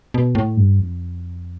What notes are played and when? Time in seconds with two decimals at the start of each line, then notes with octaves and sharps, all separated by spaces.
0.14 B2
0.35 A2
0.57 G2
0.79 F2